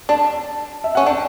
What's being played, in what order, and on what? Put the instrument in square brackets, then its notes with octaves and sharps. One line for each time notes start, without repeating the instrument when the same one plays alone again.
[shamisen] D4 [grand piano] A5
[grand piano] E5
[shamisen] C#4 [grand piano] F#5
[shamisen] D4 [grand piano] G5